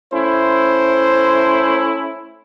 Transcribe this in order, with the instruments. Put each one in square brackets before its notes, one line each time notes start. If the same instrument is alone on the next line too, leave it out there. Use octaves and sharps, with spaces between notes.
[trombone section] A3 C#4 E4 [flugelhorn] C5